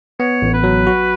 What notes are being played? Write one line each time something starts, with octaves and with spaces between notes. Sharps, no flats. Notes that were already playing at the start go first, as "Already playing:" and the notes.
B3 C#5
A1
B4
F#3
F#4